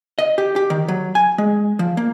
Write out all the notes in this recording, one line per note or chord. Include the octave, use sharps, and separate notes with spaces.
D#5
G4
G4
D#3
F#3
G#5
G#3
F3
A#3